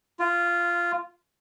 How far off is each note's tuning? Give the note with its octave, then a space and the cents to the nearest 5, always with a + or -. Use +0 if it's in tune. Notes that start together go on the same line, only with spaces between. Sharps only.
F4 -10